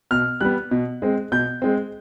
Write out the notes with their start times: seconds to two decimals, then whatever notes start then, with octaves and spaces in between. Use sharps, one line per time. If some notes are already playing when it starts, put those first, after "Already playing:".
0.11 B2 F6
0.41 G3 B3 F#6
0.71 B2
1.02 G#3 C4
1.32 B2 G6
1.62 G#3 C4